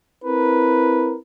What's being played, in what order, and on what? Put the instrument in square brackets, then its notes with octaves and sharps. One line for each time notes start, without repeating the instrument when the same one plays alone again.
[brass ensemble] C4 E4 A#4 B4